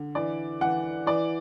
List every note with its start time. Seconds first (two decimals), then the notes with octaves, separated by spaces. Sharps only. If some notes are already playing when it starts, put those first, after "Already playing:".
Already playing: D3
0.15 E3 D5
0.61 E3 F#5
1.06 E3 D5